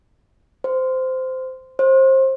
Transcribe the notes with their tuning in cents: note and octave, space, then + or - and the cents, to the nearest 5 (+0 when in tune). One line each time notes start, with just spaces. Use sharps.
C5 -15
C5 +25